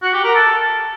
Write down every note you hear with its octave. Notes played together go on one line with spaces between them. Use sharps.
F#4
G4
A#4
A4